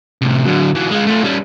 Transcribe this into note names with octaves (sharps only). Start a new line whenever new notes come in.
A2 C3
D3 F#3
E3 F#3
G#3 F4
A3 F4
G3 C#4